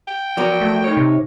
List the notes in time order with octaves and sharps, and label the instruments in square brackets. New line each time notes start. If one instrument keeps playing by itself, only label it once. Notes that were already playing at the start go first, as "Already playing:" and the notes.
[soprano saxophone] G5
[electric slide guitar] F3 F#3 [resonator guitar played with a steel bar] B3 A#4 D5
[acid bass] A3
[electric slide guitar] D#4 C#5
[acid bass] C3